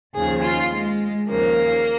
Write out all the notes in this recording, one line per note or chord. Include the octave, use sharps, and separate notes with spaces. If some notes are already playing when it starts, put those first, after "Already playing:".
D#2 C#3 F3 G#4
F4
G#3
D#2 C#3 F3 A#3